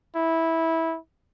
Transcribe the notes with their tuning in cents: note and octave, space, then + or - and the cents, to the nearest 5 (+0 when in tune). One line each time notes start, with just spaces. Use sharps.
E4 -15